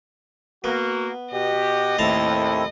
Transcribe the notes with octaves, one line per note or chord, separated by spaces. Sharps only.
A#3 B3 F#4
B2 F#4 G4 D#5
D#2 A2 C4 E4 A4 A5 A#5